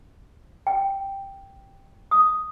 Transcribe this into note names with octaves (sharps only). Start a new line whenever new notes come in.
G5
D#6